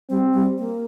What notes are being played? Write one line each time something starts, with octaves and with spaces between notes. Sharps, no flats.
G3 C4
G3
A#3